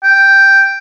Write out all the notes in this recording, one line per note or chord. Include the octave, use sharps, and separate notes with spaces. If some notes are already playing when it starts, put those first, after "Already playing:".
G5